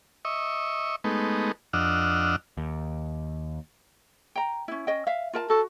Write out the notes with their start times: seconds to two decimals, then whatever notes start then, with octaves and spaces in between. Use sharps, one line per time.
0.25 D#5 E5 C#6
1.04 G#3 A3 B3 D#4
1.73 F2 D4 D#5 F#5 E6 F6
2.57 D#2
4.36 G5 A#5
4.68 C#4 E4
4.87 C#4 D#5 G5
5.07 E5 F5
5.33 F4 A#4 A5
5.50 F#4 A4